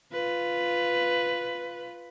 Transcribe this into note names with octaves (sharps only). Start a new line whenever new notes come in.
F4 B4